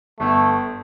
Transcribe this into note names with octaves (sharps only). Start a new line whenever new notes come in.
G1 A3